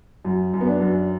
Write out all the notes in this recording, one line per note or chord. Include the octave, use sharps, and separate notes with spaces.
F#2
F#2
B3
D4
F#2